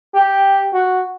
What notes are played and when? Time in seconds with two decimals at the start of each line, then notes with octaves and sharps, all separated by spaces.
0.14 G4
0.73 F#4